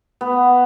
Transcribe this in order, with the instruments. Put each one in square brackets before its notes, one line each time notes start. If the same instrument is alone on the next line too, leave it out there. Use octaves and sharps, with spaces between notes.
[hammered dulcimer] B3